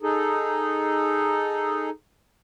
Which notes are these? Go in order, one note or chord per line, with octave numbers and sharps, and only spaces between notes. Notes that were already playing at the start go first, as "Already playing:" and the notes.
D#4 G#4 A4